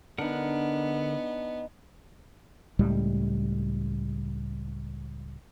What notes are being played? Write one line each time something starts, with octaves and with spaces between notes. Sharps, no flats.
D3 B3 D4 D#4 A#4 F#5
C#2 A2 G3 G#3